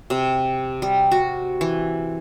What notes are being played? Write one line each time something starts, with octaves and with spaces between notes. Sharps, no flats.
C3
G3
F#4
E3